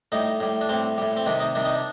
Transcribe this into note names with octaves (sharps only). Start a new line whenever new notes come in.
A2 G3 D#4
A2 G3
D4
A2 G3 C4
A2 G3
C4
C3 D#3 G3 D4
D#4
C3 D#3 G3 D4
D#4
D4